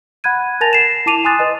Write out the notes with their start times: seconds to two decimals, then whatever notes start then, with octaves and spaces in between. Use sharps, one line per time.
0.24 F#5 B5 F#6 G#6 D#7
0.61 A#4 G#5 A5 A6 A#6 F7
0.73 C7 E7
1.06 E4 A5 D6 D#7 F7
1.24 G#5 C6 D#6 F#6 A6
1.39 B4 D#5